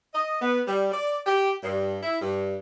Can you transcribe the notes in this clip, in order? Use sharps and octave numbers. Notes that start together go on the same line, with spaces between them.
D#5
B3
G3
D5
G4
G2
E4
G2